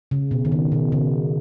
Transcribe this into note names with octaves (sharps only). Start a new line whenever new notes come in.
C#3
B2
D#3
C#3
B2
C#3